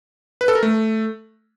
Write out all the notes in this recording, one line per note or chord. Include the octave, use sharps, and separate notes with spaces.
B4
A4
A#4
A3